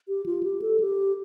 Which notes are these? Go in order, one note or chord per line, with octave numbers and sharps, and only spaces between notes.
G4
F4
G4
A4
G4